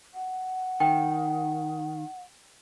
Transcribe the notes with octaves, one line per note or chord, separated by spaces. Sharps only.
F#5
D#3 G5